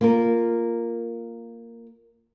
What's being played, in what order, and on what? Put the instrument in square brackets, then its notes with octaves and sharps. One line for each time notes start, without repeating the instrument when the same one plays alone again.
[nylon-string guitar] A#3 F4 A#4